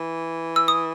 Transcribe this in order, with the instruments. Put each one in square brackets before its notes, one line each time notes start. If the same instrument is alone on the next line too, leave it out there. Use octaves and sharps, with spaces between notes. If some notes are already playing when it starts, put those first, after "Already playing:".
Already playing: [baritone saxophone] E3
[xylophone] E6
D#6